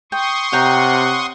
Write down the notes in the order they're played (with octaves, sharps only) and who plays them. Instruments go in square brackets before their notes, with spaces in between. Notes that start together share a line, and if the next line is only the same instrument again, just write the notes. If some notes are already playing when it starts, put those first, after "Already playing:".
[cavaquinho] G5 [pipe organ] C6 C#6 D#6
[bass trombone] C3 [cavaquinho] C#5 G5 A#5 [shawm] F#5